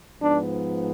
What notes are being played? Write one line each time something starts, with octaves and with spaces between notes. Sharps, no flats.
G#2 F3 B3 D4